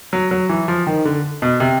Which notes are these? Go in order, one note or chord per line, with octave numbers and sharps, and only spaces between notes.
F#3
F#3
E3
F3
D#3
D3
B2
C3